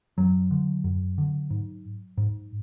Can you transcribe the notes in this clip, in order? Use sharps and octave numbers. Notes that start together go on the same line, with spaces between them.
F#2 F#3
D3
F#2
D3
G#2
G#2